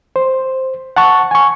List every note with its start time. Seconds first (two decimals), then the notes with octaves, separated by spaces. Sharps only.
0.16 C5
0.96 F#5 A5 C#6
1.31 G#5 C#6